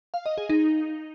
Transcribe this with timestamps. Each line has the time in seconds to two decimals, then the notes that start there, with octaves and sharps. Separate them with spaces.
0.14 F5
0.26 D#5
0.38 G#4
0.49 D#4